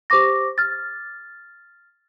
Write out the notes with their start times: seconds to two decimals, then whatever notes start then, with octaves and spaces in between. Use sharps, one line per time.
0.10 G4 C5 C#6 D6 A#6
0.58 F6 A6